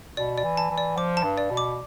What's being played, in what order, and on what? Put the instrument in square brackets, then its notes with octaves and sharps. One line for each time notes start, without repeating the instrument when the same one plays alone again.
[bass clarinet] B2 [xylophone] D5
[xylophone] D5
[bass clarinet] E3
[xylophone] A5
[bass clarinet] E3
[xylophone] D5
[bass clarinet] F3 [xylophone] D6
[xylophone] A5
[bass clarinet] G2
[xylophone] D5
[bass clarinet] B2
[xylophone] D6